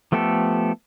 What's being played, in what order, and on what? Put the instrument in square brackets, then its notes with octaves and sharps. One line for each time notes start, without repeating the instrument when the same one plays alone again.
[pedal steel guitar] F3 A3 B3 G4 A4